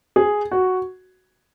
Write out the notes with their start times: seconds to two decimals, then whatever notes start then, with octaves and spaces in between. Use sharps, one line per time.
0.16 G#4
0.51 F#4